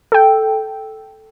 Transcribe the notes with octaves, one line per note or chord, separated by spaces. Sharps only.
A4 G5